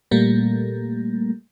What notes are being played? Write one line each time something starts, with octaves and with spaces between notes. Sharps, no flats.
A#2 G3 A3 A#3